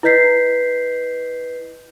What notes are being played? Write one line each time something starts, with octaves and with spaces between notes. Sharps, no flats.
E4 B4 D#5 G6 B6 C7